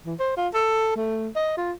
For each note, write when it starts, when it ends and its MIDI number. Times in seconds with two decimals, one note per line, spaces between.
0.06 0.14 52
0.19 0.32 72
0.37 0.48 65
0.54 0.95 69
0.96 1.29 57
1.36 1.54 75
1.57 1.72 65